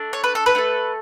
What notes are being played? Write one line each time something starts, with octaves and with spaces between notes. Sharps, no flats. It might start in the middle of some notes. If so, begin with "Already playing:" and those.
Already playing: A3 D4
C#5
B4
A4
B4
A3 E4 A4